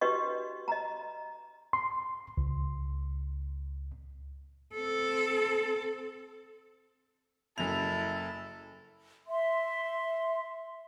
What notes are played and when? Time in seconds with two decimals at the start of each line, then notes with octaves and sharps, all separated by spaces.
0.01 D4 F#4 G4 B4 D#5 C#6
0.68 D#5 A#5
1.73 C6
2.37 C#2
4.75 C4 A4
7.58 F#1 E4 A4 F7
9.28 E5 C6